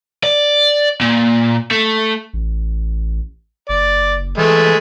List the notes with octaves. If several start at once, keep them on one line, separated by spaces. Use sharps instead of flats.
D5
A#2
A3
A1
F#1 D5
E3 G#3 A3